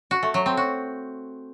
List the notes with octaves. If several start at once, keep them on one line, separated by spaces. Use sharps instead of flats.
F#4
A3
F#3
C4
F#4